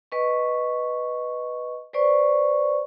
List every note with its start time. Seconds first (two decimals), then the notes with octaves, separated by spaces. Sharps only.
0.12 B4 D#5 C#6
1.93 B4 C5 D5 C#6